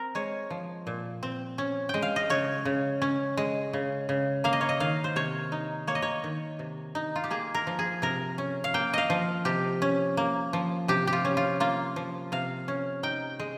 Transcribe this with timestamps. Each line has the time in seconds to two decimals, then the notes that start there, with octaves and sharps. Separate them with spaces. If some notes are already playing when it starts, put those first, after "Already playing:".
Already playing: C4 A#4
0.15 G#3 C#5
0.50 F3
0.87 A#2
1.23 C4
1.58 C#4
1.89 G#3 G5
2.02 F5
2.16 D#5
2.30 C#3 C#5
2.65 C#3
3.02 C#4
3.37 G#3
3.73 C#3
4.09 C#3
4.44 A#3 F5
4.53 D#5
4.61 C#5
4.69 D#5
4.80 D#3 F5
5.04 C5
5.16 C3 C#5
5.52 D#4
5.87 A#3 C#5
5.95 D#5
6.02 C#5
6.24 D#3
6.59 C3
6.95 D#4
7.16 F4
7.24 G4
7.30 A#3 G#4
7.54 A#4
7.67 F3
7.79 G#4
8.02 C3 A#4
8.38 C#4
8.64 F5
8.74 A#3 G5
8.93 D#5 F5
9.10 F3
9.45 C3 G4
9.82 C#4
10.17 A#3
10.53 F3
10.88 C3 G4
11.07 G4
11.13 F4
11.25 C#4
11.37 F4
11.60 A#3 F4
11.96 F3
12.32 C3 F5
12.68 C#4
13.03 D#4 G5
13.39 G#3